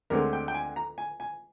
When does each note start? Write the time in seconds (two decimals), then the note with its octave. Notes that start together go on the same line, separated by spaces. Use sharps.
0.10 D2 D3 G#3 C4 A#4
0.33 G5
0.48 G5
0.54 G#5
0.76 A#5
0.98 G#5
1.20 G#5